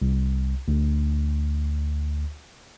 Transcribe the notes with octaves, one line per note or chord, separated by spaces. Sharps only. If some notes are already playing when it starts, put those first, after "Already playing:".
C2
D2